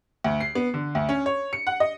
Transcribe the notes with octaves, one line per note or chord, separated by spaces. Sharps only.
D2
C7
B3
D3
D2
C#4
C#5
C#7
F#5
D#5